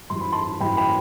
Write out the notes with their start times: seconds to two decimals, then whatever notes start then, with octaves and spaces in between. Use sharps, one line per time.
0.10 F#2 E3 G3 C6
0.21 B5
0.32 A5 C6
0.60 F#2 E3 G3 G5 B5
0.77 G5 B5